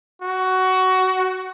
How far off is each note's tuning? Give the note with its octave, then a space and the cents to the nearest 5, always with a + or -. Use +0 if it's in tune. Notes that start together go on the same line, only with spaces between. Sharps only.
F#4 +15